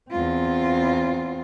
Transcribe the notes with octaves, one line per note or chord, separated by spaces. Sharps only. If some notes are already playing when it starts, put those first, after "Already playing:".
E2 C4 F4